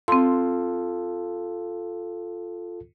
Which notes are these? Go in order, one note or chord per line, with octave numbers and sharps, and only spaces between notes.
C4 F4 A4 C6